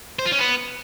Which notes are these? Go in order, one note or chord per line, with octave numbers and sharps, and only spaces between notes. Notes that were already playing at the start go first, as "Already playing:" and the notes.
C5
F4
C#4
B3